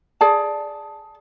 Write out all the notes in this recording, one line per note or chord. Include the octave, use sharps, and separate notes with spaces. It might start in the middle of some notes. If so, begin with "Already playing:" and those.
G#4 D5 A5